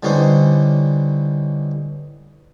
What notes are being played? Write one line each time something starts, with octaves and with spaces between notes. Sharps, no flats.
D3 E3 G3 C#4 D#4 C5